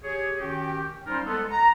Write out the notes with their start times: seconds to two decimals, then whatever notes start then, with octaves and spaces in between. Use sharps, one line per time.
0.04 G4 G#4 C#5
0.39 D#3 C#4 F#4 G4
1.06 G3 C#4 D#4 F4 A#4 C5
1.25 G#3 B3 A4
1.50 A#5